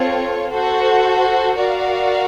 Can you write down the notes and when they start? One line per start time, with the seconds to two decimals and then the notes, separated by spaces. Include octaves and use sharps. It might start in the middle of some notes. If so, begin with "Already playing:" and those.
Already playing: C4 F4 A4 C#5
0.49 F#4 A4 C5
1.56 F#4 A#4 D5 F5